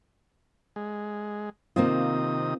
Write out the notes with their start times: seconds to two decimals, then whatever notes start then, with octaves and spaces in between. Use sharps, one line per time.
0.76 G#3
1.76 C3 D#3 A#3 C4 F4 D#6